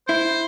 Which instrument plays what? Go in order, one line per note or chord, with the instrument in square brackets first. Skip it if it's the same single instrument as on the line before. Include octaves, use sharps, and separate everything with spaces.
[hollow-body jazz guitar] E4 [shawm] C5